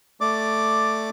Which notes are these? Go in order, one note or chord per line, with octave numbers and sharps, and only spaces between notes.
A3 D5 D6